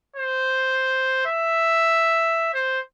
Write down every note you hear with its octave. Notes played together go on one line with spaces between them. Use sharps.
C5
E5
C5